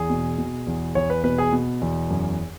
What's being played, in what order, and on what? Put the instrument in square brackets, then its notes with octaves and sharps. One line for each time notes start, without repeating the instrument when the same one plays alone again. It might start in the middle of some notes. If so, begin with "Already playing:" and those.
Already playing: [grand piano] E2 G#4
B2
B2
E2
E2 C#5
B4
B2 B4
G#4
B2
E2
F#2